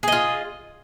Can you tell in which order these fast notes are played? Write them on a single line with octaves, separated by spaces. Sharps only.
G#4 D#5 F4